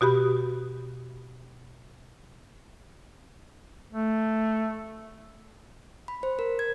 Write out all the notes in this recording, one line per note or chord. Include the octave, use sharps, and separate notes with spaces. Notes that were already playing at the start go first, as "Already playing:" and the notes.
B2 F#4 G4 B5
A3
B5
C5
A#4
G#6